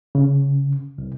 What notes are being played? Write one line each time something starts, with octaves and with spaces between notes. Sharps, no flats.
C#3
C2